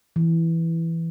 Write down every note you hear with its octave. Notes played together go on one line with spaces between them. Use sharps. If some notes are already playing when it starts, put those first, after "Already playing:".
E3